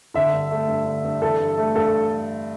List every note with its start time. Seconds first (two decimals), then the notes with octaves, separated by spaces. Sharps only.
0.14 D3 E5
0.33 G2
0.51 A3
0.68 G2
0.86 D3
1.04 G2
1.22 E3 A4
1.40 G2
1.58 A3
1.75 G2 A4